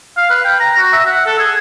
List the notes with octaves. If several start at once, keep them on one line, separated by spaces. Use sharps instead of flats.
F5
B4
G5
A#5
F#4
E5
F#5
A4
G#4